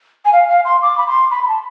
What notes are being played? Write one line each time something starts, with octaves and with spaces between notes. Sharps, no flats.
G#5
F5
F5
C6
D6
B5
C6
B5
B5
A5